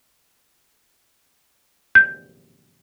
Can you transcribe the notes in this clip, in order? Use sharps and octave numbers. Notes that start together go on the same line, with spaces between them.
G6